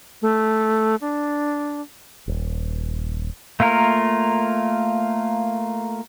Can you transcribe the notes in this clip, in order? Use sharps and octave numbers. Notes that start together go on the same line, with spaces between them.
A3
D4
D#1
A3 A#3 F4 A#4